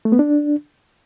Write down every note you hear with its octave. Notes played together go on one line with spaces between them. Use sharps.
A3
B3
D4